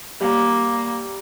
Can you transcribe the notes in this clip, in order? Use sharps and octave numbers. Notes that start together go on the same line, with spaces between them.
G3 A#3